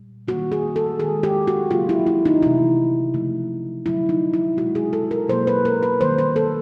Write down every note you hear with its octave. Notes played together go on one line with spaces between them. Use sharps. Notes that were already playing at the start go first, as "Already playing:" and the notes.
Already playing: A#2 G3
D#3 G3 A#3 F#4
G#4
A4
D#3 G#3 G#4
G4
F#4
C#3 F#3 A#3 F4
E4
E4
D#4
C3 E3 A3 E4
C#3 F3 A3
D3 F#3 A3 E4
D#4
E4
B2 G#3 F#4
G#4
A4
A#4
B2 F#3 A#3 C5
B4
A#4
B4
D#3 G3 A#3 C5
C5
A4